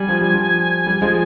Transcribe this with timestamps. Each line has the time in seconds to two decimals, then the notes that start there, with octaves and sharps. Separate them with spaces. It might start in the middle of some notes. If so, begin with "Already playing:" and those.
Already playing: G3 G#5
0.09 F3
0.21 G3
0.34 F3
0.86 G3
1.02 F3 G#3